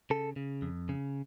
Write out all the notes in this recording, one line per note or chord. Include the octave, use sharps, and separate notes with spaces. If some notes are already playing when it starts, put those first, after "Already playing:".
C#3 A4
C#3
F2
C#3